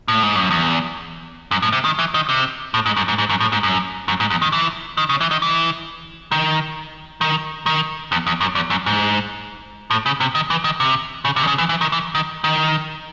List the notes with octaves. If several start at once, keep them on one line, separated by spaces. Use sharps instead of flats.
A2
G#2
F#2
E2
F#2
A2
C3
D#3
E3
D#3
C3
A2
G#2
F#2
G#2
G#2
F#2
A2
G#2
F#2
F#2
G#2
E2
D#3
E3
D#3
C#3
E3
D#3
E3
D#3
D#3
D#3
E2
E2
F#2
E2
F#2
G#2
A2
C#3
C3
D#3
E3
D#3
C3
C#3
C3
D#3
C#3
E3
E3
D#3
E3
D#3
D#3